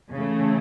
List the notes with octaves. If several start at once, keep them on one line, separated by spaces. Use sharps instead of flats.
C#3 E3 A3